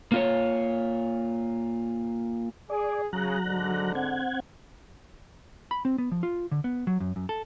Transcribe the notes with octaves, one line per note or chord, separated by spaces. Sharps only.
A#3 F4 C#5
G#4 D5
C#3 F#3 A#5 F#6
G#2 D3
C4 F#5 G#6
B5
C4
B3
F3
F4
D3
B3
F#3
F#2
F#2
A4